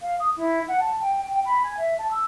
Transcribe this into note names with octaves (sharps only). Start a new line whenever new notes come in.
F5
D#6
E4
F#5
A5
G5
G5
B5
G#5
E5
A5
E6